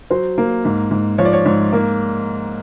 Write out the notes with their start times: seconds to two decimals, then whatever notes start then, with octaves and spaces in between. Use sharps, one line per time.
0.10 F#3 C5
0.38 A#3
0.65 G#2
0.91 G#2
1.18 F3 C#5
1.25 D5
1.33 C#5
1.46 G#2
1.73 A#3